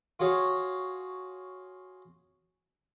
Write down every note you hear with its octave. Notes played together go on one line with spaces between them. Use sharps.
F4 F#4 G#4 C#5 F5